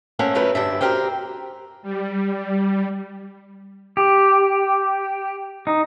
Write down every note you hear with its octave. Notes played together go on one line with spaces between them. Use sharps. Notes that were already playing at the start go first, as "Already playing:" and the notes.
A3 A#3 C#4 C5 E5 F#5
F3 F#3 A3 A#4 B4
G2 D3 E5
F#4 G4 A#4 C5 G5
G3
G4
D#4